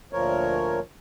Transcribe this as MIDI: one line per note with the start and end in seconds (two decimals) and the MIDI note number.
0.13 0.80 38
0.13 0.80 46
0.13 0.80 53
0.13 0.80 70
0.13 0.80 73